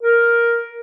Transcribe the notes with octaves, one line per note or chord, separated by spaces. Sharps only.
A#4